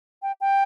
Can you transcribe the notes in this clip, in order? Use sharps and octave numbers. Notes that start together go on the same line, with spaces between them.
G5
G5